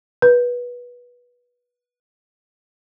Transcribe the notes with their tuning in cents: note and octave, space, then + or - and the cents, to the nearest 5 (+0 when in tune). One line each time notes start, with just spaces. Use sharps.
B4 -20